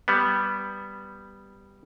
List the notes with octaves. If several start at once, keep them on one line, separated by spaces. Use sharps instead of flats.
G3 B3